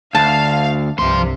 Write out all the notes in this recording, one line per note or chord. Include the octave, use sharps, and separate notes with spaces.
D2 F5 A5
C2 G2 C3 F3 C6